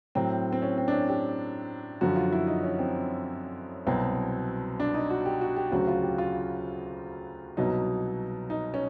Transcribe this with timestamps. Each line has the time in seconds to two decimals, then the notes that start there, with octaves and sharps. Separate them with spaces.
0.15 A2 F#3 C4
0.52 C4
0.62 C#4
0.78 C4
0.88 D4
0.93 C#4
1.09 G4
2.01 F#2 D3 F3 F#4
2.16 F4
2.33 E4
2.47 D#4
2.63 C#4
2.79 C4
3.87 C2 B2 F#3 C4
4.80 D4
4.94 D#4
5.10 F#4
5.25 G4
5.41 F#4
5.56 G4
5.71 D2 C#3 F#3 F#4
5.87 F4
6.03 G4
6.18 F4
7.57 C2 B2 F#3 D#4
8.50 D#4
8.74 C#4